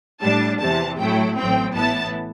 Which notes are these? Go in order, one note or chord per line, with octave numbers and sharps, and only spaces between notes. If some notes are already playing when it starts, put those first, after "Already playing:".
A2 G3 D4 A5
E2 C3 E3 A5
A2 F#3 A3 E4 G5
A1 A2 F#3 C4 G5
A1 A2 E3 B3 E4 A5